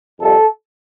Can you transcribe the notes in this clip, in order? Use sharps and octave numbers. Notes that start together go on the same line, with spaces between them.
F2 C3 G3 A4